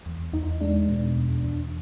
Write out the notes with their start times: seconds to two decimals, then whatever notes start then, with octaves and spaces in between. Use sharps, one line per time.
0.06 E2
0.33 E2 D#4
0.61 G#3 D4
0.89 B2
1.16 E2
1.43 E2